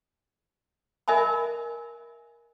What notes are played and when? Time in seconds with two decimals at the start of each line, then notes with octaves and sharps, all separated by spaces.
1.08 A#4 D#5 E5 G#5 B5